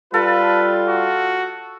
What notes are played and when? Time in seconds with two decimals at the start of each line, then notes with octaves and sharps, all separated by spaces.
0.14 G3 F4 A4 B4 F5 A5
0.89 F#4